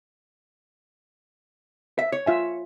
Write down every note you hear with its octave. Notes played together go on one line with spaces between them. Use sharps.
E5
C#5
F4 E5 G#5